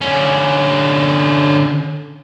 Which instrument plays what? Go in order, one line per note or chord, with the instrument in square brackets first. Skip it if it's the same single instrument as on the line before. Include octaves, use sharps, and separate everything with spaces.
[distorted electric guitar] D3 C#4